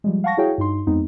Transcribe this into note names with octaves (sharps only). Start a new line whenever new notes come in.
F3 G3 G#3
F5 F#5 A5 C#6 A#6
E4 F#4 G#4 C#5 F5 G5
G2 D#4 C6
F2 G#3 B3 C4 D#4